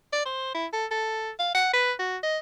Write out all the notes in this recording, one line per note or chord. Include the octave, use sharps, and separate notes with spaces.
D5
C5
E4
A4
A4
F5
F#5
B4
F#4
D#5